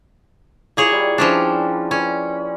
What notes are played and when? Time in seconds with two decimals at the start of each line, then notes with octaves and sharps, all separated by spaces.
0.77 A#3 E4 F4 G#4 C#5 D#5
0.92 G3
1.18 F3 C#4 D4 B4 E5 G5
1.91 C#4 B4 D5